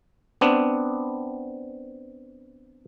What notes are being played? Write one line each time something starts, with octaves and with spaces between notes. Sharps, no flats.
B3 C4 D4